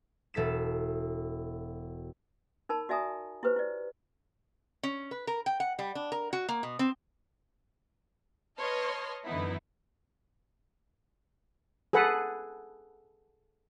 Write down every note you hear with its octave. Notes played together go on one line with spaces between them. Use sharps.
E1 A4 B6 E7
D#4 A#4 A5 B5
F#4 D5 E5 G#5 A#5 D#6
E4 G4 B4 C5
E4 D5
C#4
B4
A#4
G5
F#5
G3
D4
A#4
F#4
A#3
B2
C4
B4 C#5 D#5 A5 C6 F6
F#2 D3 E3 B3 D#4 E4
G#4 A4 B4 F#5